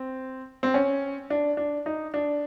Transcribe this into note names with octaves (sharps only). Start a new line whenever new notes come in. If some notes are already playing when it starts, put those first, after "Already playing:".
Already playing: C4
C4
C#4
D4
D4
D#4
D4